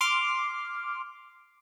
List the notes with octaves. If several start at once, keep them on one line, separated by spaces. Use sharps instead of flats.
C6 D6 F6